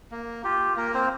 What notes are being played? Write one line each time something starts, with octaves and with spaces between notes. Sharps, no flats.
A#3
F4 G4
A#3 A#4
C4 C5